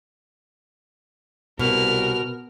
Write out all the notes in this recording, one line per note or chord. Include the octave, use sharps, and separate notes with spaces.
C2 B2 A#4 F6